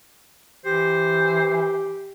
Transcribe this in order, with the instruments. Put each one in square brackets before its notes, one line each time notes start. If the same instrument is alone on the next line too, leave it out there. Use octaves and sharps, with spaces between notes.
[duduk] E3 [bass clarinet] G4 [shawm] C5